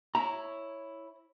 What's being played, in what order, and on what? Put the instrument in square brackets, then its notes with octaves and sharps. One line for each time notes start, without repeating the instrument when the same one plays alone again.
[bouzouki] E4 C#5 [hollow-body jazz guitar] A#5